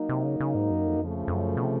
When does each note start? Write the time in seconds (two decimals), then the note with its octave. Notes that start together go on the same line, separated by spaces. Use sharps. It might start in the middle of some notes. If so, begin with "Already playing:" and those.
Already playing: F#3 A#3 D#4
0.09 C3
0.24 C#3
0.40 C#3
0.55 G#2
0.71 F#2
0.87 F2
0.97 F#2
1.02 F2 C#3 F3 A3
1.28 F2
1.33 F#2
1.57 B2
1.63 C3